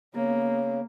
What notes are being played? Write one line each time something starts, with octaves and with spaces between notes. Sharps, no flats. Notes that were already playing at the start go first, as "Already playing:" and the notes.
C#3 A#3 B3